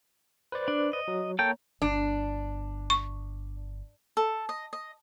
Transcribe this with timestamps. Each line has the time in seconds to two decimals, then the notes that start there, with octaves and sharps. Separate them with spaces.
0.52 B4 C5 D5
0.68 D4
0.93 D#5
1.08 F#3
1.39 A#3 A4 C#5 G5 A#5
1.82 G1 D4
2.90 C#6
4.17 A4
4.49 D#5
4.73 D#5